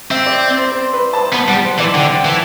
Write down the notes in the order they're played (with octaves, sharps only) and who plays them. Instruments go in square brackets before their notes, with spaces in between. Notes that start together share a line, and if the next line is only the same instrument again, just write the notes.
[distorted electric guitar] C4 [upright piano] E5
[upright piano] D5
C5
C5
B4
A5
[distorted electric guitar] B3 [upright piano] A5
[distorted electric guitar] G3 [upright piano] F#5
[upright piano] C5
[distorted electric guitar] E3 [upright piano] D5
[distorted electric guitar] D3 [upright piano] G5
[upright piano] G5
F#5
[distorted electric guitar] E3